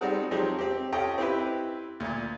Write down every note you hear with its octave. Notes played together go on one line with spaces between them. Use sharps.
G3 G#3 C4 D#4 F#4 A4
F3 F#3 G#3 C4 D#4 G4
C4 G4
C#4 F4 G4 A4 D#5 G5
C4 E4 G4 B4
D2 A#2